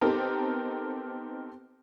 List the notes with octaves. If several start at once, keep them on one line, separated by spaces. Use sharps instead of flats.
B3 C4 D#4 G4 A4 A#4